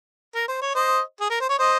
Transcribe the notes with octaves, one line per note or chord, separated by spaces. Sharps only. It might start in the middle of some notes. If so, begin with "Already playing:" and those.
A#4
C5
C#5
C5 D#5
G#4
A#4
C5
C#5
C5 D#5